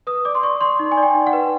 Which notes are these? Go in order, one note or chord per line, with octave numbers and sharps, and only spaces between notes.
B4 D#6
D5 D6
C6
D5 C#6
D5 C6
D#4
G#5
D5
G5
D#4
F#5
B4